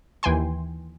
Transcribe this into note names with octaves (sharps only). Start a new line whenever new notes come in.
D#2 E3 G5 G#5 C6